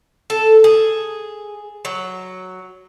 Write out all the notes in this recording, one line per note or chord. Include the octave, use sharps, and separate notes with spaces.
A4
G#4
F#3